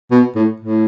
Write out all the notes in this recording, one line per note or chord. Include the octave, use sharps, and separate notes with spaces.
B2
A2
A2